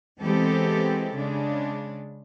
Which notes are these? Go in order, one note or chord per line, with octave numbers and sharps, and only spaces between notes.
E3 G#3 B3 C4 G4 A4
C#3 G#3 D4